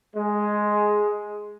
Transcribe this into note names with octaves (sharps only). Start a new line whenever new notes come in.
G#3